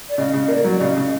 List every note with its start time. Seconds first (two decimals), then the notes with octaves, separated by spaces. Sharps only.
0.09 D5
0.18 C#3 D#5
0.33 C#3
0.48 A#3 D5
0.64 F#3
0.80 C#3 D#5
0.97 C#3